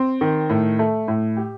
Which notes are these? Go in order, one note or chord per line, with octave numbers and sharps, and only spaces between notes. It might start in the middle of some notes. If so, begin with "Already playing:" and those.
Already playing: C4
D#3
A2
A3
A2
G4